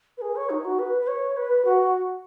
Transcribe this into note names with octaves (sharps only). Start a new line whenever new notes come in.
B4
G#4
C#5
D#4
F#4
B4
B4
C#5
B4
F#4